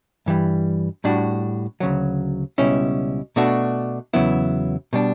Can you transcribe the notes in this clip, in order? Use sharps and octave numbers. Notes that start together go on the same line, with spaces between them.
G2 E3 G3
A2 G3 D4 F#4
D2 C#3 F#3
C#2 B2 G3 C#4 E4
B2 A3 D4 F#4
E2 C#3 F#3 B3 E4
B2 G3 D4